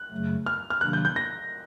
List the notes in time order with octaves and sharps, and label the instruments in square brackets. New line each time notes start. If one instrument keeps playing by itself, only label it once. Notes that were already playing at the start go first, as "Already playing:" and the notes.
Already playing: [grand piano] F#6
[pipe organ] F#2 C#3 F#3 A3
[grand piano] F6
F6
[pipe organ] C3 D#3 F#3 A#3 D4 [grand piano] F#6
[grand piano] G6
G6
A#6